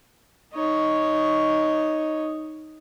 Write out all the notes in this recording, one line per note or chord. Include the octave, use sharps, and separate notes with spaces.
D#4 C#5